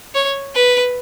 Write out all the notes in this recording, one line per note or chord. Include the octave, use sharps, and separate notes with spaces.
C#5
B4